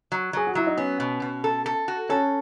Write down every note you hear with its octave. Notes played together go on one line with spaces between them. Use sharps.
F#3
F#3 G#4
F#4
F#3 E4
D#4
B3 C#4
B2
B2
A4
A4
F#4
C#4 A4